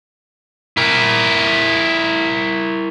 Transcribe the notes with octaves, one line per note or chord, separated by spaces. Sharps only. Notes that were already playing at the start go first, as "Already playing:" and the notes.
E4 A#4